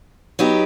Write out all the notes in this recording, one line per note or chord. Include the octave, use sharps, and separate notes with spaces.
F#3 B3 D#4 G4